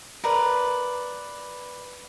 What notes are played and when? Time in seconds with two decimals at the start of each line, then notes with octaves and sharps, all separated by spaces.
0.24 A#4 B4 D5